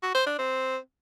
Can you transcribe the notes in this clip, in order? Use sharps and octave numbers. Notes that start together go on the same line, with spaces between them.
F#4
C5
D4
C4